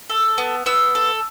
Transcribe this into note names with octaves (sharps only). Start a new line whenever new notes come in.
A4
B3
B3 E6
A4